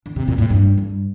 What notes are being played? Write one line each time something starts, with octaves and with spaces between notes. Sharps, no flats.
D3
C3
A#2
A2
G2
G2